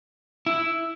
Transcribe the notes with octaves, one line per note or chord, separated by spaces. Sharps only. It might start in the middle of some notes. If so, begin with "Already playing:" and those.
E4